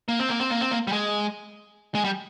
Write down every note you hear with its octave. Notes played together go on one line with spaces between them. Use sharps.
A#3
C4
A#3
C4
A#3
C4
A#3
G3
G#3
G#3
G3